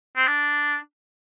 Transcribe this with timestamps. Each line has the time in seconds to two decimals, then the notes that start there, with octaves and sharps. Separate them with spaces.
0.16 C4
0.27 D4